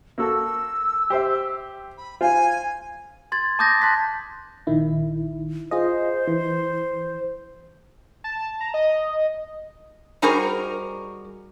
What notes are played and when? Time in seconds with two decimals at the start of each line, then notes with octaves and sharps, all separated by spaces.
0.18 A#3 F#4 A4 E6
1.10 G4 C5 E5
1.97 B5
2.21 F4 C5 G#5
3.32 C6 G#6 A6
3.59 A5 D6 D#6 G6 A6 A#6
3.82 A5 C6 F#6 A6 B6
4.67 A#1 D#3 E4
5.71 F4 G#4 C5 D#5
6.28 E3
8.24 A5
8.61 A#5
8.74 D#5
10.22 G3 D#4 F#4 G#4 A#4 C5